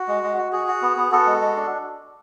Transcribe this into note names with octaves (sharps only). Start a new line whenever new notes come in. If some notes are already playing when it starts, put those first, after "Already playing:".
Already playing: F#4
G#3
G#3
F#4
F#4 G#4
F#4
B3
B3
B3 F#4 A4
G#3
G#3
D4